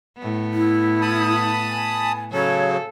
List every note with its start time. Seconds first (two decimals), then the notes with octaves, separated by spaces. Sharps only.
0.18 A2 B3
0.54 E4
1.02 A5 B5 D#6
1.69 G#5
2.32 C#3 F#3 A4 C#5